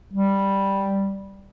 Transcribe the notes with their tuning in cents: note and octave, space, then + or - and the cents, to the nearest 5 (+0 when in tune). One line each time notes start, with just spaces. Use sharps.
G3 +0